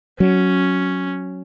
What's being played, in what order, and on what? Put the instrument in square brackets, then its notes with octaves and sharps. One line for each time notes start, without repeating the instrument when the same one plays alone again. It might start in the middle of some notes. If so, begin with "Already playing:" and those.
[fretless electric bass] F#3 [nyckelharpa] C#4